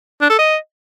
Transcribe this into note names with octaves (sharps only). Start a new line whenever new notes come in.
D4
A4
D#5